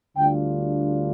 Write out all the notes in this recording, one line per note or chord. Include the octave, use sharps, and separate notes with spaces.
D2 D3 G3 D4 F4 G5